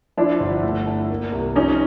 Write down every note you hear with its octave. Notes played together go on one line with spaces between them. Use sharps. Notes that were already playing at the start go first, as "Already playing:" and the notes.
F3 D4 E4
G1
A3
A3
A#3
C2
F3 C#4 D#4